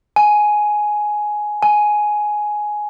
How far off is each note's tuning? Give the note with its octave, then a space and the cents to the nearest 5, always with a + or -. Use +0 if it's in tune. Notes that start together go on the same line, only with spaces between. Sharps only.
G#5 +10
G#5 +10